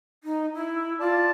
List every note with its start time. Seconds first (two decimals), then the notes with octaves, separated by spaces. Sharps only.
0.24 D#4
0.54 E4
1.00 F4 D5 A5